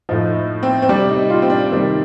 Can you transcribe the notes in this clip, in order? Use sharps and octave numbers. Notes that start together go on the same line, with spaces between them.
A2 F3 D#4
C4
C4
C3 G3 D4
D#4
F4
C4
D4
C3 D#3 G3